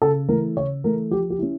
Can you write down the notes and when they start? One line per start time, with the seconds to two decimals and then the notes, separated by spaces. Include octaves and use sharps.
0.02 C#3 A4
0.29 E3 A3 A#4
0.56 C#3 C#5
0.84 E3 A3 A#4
1.11 F3 G4
1.30 G4
1.39 C#4 E4